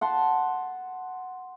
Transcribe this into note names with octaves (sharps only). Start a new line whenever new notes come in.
F#5 A5 C6